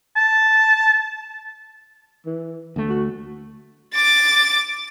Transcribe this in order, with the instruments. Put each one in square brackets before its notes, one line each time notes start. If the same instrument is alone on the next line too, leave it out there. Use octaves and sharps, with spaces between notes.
[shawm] A5
[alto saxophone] E3
[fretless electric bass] D2 A3
[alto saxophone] F#4
[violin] D6 A6